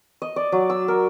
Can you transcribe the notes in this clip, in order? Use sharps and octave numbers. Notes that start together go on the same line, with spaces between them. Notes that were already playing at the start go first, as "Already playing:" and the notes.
D#5
D5
F#3
E6
A#4